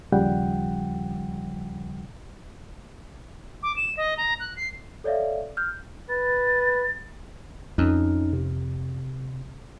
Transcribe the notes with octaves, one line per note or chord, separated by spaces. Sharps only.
D#2 C#3 F3 G3 F#5 G5
D6
E7
D#5
A#5
F#6
C7
A4 C#5 D5 E5 F5
F6 G6
B4 A6
F2 C#4 D#4
C3